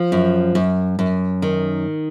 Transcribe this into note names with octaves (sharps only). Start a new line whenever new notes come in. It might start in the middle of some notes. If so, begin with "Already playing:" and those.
Already playing: F3
F#2
F#2
F#2
D#3